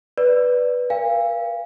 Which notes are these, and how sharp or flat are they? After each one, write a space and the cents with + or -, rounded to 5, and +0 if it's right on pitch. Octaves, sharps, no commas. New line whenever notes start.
B4 +0 D5 +0
A#4 +40 F5 -25 G#5 -40